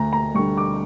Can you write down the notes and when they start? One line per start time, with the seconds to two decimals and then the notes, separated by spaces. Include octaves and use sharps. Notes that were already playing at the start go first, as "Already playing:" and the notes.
Already playing: D2 A#5
0.13 A#5
0.34 D3 G3 C#6
0.57 D6